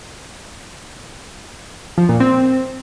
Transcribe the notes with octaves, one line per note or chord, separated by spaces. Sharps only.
F3
A#2
C4